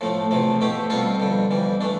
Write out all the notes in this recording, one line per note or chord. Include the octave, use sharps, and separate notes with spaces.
A2 F3 A3
E2 C3 F3 A3
B2 A3 E4 G4
B2 G3 C4 F4 A4
F2 D3 G3
F2 E3 G3
E3 A3 D4